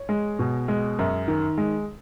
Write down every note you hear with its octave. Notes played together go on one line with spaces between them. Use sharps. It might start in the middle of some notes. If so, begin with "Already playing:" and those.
Already playing: C#5
G#3
B2
G#3
F#2
D#3
G#3